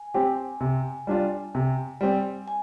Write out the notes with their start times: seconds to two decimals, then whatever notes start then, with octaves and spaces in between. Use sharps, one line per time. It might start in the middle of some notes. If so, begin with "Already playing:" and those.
Already playing: G#5
0.14 C4 G4
0.61 C3
1.07 G3 D4 F4
1.55 C3
2.01 G3 C4
2.48 G#5